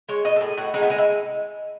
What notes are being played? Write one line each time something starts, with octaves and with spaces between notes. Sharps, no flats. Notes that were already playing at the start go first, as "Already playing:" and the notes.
G#3 C#5
B2 D#5
A4
A2 G#4
A2 F#4
G#3 D#4
B3
G#3 D#4
E4